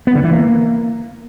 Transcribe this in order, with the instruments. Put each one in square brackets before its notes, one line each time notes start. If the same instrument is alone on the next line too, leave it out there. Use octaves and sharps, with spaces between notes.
[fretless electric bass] B3
D3
E3
A#3